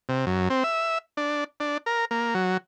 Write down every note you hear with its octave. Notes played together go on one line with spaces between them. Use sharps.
C3
F#2
C4
E5
D4
D4
A#4
A#3
F#3